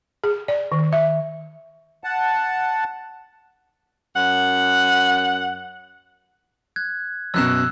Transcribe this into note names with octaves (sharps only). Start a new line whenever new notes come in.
G#4
D5
D#3
E5
F#5 A5
F#2 F#5
F#6 G#6
F#2 B2 E6 F#6 E7